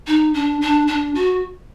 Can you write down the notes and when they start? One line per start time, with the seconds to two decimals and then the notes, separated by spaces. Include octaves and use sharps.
0.07 D#4
0.34 D4
0.61 D4
0.87 D4
1.15 F#4